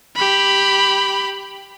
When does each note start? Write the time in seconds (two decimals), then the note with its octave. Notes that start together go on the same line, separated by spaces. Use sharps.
0.16 G4 B5